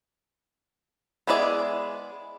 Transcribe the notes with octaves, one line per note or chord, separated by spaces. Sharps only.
G#3 B3 E4 G#4 D5